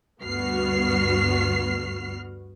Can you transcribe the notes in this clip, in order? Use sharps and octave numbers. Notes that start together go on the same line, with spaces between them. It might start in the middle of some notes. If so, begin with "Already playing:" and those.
D2 G2 B3 F#4 F6 C7